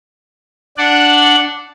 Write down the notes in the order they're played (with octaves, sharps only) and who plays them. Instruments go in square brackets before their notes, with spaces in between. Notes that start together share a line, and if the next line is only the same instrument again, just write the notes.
[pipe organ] D4 D5 F#5